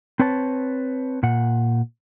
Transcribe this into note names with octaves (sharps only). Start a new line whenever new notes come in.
C4 B4 C#5 A5
A#2 F#5